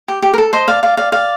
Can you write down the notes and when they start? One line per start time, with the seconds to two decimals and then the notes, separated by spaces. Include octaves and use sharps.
0.08 G4
0.22 G4
0.34 A#4
0.38 A4
0.53 C5 D#5
0.68 D5 F5
0.83 D5 F5
0.97 D5 F5
1.12 D5 F5